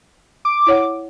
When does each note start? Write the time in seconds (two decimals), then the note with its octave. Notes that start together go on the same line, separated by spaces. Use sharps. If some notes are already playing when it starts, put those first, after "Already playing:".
0.45 D6
0.67 E4 C#5 F#5